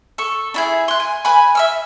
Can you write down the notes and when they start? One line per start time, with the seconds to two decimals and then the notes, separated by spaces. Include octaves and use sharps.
0.18 A4 C#6
0.54 D4 E4 G#4
0.88 C6 F#6
1.00 G#5
1.25 B4 G#5 B5
1.55 E5 E6 F6